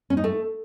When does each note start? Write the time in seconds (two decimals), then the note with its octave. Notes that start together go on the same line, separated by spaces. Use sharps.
0.10 C#4
0.17 D#4
0.24 A3